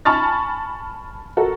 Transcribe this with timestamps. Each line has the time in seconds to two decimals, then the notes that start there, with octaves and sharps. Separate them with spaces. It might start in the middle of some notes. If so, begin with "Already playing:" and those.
0.05 G#5 A5 B5 C#6 F6 A6
1.37 F#4 A4 A#4